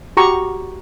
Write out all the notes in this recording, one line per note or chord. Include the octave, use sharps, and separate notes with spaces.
F#4 G4 A#5 C#6